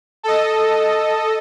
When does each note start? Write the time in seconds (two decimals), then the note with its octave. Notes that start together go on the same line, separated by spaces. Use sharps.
0.23 A4 D#5